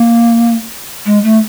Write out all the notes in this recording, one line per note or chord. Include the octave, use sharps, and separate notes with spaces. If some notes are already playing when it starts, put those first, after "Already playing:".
Already playing: A#3
G#3
A3